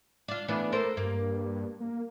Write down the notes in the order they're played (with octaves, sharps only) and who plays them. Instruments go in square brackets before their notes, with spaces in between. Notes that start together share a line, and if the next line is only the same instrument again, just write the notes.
[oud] D4 F4
[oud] E3 B3 D4 [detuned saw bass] A3
[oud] A4 A#4 C5
[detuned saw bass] G2 [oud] A#3
[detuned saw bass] A#3